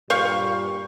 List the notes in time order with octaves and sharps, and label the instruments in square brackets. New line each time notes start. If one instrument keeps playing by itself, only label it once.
[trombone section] G2 A#2 G3 [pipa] C5 F5 C#6